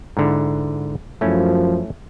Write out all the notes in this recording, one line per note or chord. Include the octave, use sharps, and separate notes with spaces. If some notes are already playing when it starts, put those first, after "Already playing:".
G#2 D3 E4
F#2 F3 A3 C#4 E4